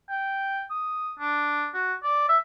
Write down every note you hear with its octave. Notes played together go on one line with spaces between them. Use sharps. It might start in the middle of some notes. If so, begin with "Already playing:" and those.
G5
D#6
D4
F#4
D5
E5